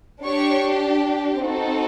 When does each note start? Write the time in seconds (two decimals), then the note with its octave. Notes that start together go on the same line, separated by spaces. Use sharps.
0.22 D4 G4 C#5 C#6
1.39 C4 D#4 F#4 A4